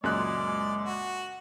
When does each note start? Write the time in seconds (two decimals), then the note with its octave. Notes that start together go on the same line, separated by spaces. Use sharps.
0.04 C#2 F#2 A#2 G#3 D5 F#6
0.83 F#4